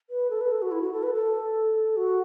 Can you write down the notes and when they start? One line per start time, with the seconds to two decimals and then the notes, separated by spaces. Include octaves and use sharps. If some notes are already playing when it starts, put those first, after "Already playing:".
0.10 B4
0.30 A4
0.41 B4
0.51 A4
0.62 F#4
0.71 E4
0.82 F#4
0.93 A4
1.03 B4
1.14 A4
1.97 F#4